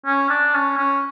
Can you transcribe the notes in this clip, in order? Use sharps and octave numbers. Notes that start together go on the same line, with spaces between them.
C#4
D4
C#4
C#4